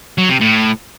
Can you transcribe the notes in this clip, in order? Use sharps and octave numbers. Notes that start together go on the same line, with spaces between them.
F#3
C3
A2